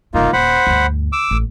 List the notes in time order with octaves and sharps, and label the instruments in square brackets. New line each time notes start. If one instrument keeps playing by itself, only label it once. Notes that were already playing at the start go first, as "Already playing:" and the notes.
[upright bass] F1 G2 [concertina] A#3 D#4 F4
[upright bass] D#1 [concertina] C5 F#5 B5
[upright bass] D2 G2
[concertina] D6 E6
[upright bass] A1